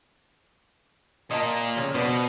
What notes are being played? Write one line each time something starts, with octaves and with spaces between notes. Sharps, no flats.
A#2 A#3 D#5 A5
F2 C#3
B2 B3 D4 C5